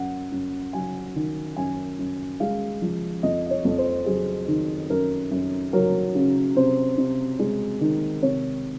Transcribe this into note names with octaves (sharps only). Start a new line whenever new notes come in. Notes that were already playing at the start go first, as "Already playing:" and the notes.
Already playing: F#2 F#5
F#2
F#3 G#5
D#3
F#2 G#5
F#2
G#3 F5
F3
F2 D#5
D#5
C#5
F2
C5
F#3 G#4
D#3
F#2 A#4
F#2
F#3 A#4
C#3
C3 C5
C3
G#3
D#3
C3 C#5